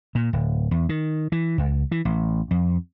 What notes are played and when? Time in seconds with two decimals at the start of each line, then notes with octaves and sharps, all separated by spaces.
0.15 A#2
0.33 D1
0.71 E2
0.89 D#3
1.32 E3
1.58 C#2
1.91 E3
2.05 A1
2.51 F2